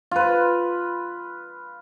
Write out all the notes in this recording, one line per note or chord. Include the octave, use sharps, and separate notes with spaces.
F4 B4